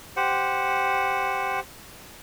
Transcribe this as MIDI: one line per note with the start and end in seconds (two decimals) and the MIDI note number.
0.17 1.60 67
0.17 1.60 72
0.17 1.60 78